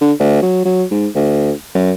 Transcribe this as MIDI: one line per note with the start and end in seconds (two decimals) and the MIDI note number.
0.01 0.12 50
0.20 0.40 38
0.43 0.63 54
0.65 0.84 54
0.91 1.07 44
1.15 1.52 38
1.75 1.92 42